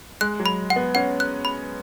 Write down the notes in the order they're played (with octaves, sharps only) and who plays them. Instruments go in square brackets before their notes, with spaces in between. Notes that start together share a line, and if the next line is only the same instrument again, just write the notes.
[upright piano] G#3 [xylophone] F#6
[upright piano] F#3
[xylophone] B5
F#5
[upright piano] B3
[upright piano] C#4 [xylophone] F#5
[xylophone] F#6
B5